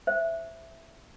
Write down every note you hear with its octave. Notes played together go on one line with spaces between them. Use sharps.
C5 E5